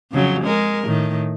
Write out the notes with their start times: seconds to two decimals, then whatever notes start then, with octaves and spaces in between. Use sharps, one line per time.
0.12 F2 C#3 F#3
0.44 G#3 A#4
0.85 A2 D#3